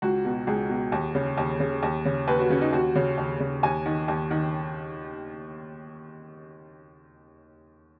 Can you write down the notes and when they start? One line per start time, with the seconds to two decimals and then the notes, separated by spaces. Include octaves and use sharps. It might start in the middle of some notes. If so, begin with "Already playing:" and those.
0.02 C#2 F#4
0.25 B2
0.47 C#2 G#4
0.70 B2
0.92 D#2
1.15 C#3
1.38 D#2
1.60 C#3
1.83 D#2
2.05 C#3
2.28 D#2 B4
2.39 F#4
2.50 C#3 C#4
2.61 D#4
2.73 D#2 F#4
2.95 C#3
3.18 D#2
3.40 C#3
3.63 D#2 G#5
3.86 D#3
4.08 D#2
4.31 D#3